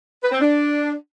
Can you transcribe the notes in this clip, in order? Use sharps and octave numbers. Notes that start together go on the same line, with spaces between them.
B4
C4
D4